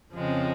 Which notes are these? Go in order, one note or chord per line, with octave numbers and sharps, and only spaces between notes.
F2 C#3 F3 G#3 C4